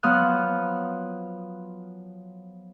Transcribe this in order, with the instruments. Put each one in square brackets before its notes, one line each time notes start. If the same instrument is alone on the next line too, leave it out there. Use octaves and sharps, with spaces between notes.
[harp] F3 F#3 B3 D#6 F6 F#6